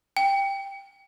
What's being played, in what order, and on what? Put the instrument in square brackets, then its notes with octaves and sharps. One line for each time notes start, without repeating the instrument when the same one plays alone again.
[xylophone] G5